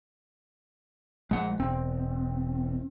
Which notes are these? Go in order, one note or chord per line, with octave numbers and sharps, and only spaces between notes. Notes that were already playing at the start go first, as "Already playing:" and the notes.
A#1 G#3 F#5
E1 C4